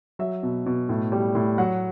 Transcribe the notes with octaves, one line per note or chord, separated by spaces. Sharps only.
F#3 E5
B2
B2
A2
G3
A2
F#3 F#5